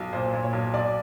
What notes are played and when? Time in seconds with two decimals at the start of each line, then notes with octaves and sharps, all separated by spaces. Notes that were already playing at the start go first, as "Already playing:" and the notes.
Already playing: B1
0.13 A#2 C5
0.33 A#2
0.43 C#5
0.53 B1
0.74 B1 D5